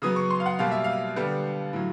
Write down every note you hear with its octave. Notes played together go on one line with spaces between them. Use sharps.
C#3 F#3 B3 D#6
C#6
C6
F5
F#5
B2 G3 A#3 F5
E5
F5
D3 G3 B3
A2 F#3